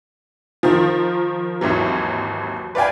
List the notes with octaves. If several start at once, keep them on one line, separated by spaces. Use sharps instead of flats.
D#3 F3
G#1 D#2 E3 F#3
B4 D5 F5 G5 G#5